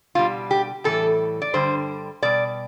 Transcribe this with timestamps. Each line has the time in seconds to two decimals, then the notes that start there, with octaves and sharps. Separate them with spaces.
0.15 B2 G3 F4
0.51 G4
0.84 A2 E3 G3 A4
1.42 D5
1.54 G2 D3 G3 C5
2.23 B2 G3 D5